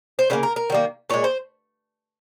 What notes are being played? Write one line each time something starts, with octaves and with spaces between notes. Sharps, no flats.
C5
C#3 G3 A#3 A#4
A#4
A#4
D#3 G3 A#3
A#2 G#3 C#5
C5